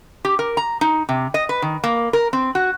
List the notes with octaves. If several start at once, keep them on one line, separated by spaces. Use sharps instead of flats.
G4
A#4
A#5
D#4
C3
D#5
B4
D#3
A#3
A#4
C4
F#4